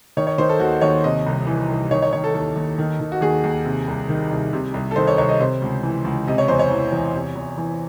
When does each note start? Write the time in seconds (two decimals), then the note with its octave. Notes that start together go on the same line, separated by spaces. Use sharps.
0.17 D#3 C#5
0.27 C#5
0.38 D#3 C5
0.49 A4
0.60 D#2 F#4
0.81 D#2 C#5
1.04 C3 D#5
1.26 C2
1.47 E3
1.69 C2
1.91 D#3 C#5
2.02 C#5
2.13 D#3 C#5
2.24 A4
2.34 D#2 A4
2.56 D#2
2.78 D#3
3.00 D#3
3.12 F#4
3.21 D#2 G#4
3.44 D#2
3.65 C3
3.87 C2
4.09 D#3
4.31 C2
4.53 C3
4.74 C2
4.91 A4
4.96 D#3 C5
5.07 C#5
5.17 C2 C#5
5.29 D#5
5.40 C3 C5
5.62 C#2
5.83 E3
6.05 C#2
6.28 C3 D#5
6.38 C#5
6.48 E2 C5
6.59 C#5
6.71 E3
6.92 E2
7.14 C3
7.35 E2
7.57 E3